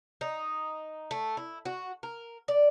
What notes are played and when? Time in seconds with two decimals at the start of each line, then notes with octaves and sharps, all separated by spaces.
0.21 D#4
1.11 A3
1.37 E4
1.65 F#4
2.03 A#4
2.48 D5